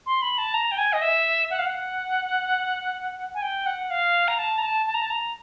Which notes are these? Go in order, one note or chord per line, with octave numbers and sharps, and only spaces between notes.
C6
B5
A5
A#5
G5
G#5
D#5
E5
F#5
F5
F#5
G#5
G5
F#5
F5
A#5
A5
A#5
A5
A5
A#5
A5
A#5